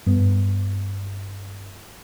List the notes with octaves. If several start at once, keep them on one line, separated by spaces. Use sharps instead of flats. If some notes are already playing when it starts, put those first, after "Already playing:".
G2 B3